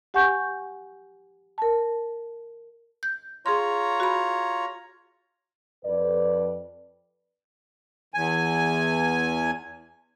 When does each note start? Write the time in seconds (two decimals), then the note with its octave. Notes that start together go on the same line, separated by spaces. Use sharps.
0.14 G4 F#5 G#5 C#6 G6
1.58 A#4 A5
3.03 G6
3.46 F4 G#4 C#5 A#5 C6
4.00 F#4 B5
5.83 F2 B4 D5
8.14 E2 G#5